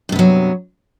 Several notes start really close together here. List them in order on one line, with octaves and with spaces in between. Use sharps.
G2 C3 B3 F#3